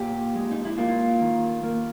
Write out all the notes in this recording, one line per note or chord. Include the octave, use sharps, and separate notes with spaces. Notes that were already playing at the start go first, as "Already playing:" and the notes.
Already playing: A#2 G4
G#3
D#4
E4
A#3 F4
D#3
A#3